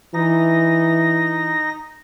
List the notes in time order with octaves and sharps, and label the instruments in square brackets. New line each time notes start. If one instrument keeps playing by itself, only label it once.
[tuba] E3 [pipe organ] D#4 A#6